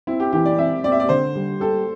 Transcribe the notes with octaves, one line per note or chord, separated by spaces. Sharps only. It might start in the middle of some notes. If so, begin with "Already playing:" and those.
C4 E4
G4
E3 G4
D5
C4 E5
C4 D5
E5
D5
D3 C5
G3
G4 A4